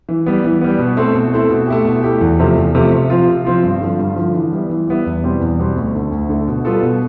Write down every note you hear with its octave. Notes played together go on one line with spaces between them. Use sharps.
E3
G3 B3
E3
G3 B3
B2
A3 C4 E4 A4
B2
A3 C4 E4 A4
B2
A3 E4 G4
B2
A3 E4 G4
E2
C3 F3 A3
E2
C3 F3 A3
C3
F3 C4 F4
C3
F3 C4 F4
G2
D3 F3
G2
D3 F3
E3
G3 B3 E4
E3
G3 B3 E4
E2
B2 G3 C4
E2
B2 G3 C4
D2
D3 A3
D2
D3 A3
B2
G3 B3 F4 A4
B2